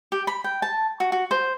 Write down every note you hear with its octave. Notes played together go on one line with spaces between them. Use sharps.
G4
B5
G5
A5
F#4
F#4
C5